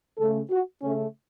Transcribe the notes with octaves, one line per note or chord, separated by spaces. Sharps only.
C#3 A3 A4
F#4
C#3 A3 C#4